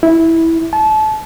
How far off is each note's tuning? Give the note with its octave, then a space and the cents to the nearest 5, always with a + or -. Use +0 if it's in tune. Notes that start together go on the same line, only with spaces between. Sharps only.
E4 -10
A5 -30